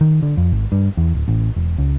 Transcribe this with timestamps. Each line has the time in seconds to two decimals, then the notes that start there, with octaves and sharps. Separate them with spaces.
0.01 D#3
0.22 D3
0.37 F2
0.52 G#1
0.72 G2
0.97 E2
1.15 D1
1.28 A1
1.56 E1
1.78 C#2